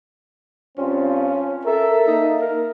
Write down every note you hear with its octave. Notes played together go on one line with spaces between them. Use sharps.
G2 C4 C#4 F4
A4 A#4 E5
A#3 D#4
A#4